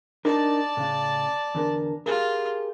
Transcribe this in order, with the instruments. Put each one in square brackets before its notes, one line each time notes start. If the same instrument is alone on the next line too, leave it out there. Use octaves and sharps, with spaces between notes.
[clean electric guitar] D4 D#4 A#4 [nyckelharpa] D5 A5
[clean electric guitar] A2 C#3
E2 D3 A#4
[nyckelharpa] F4 [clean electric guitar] G4 G#4 A#4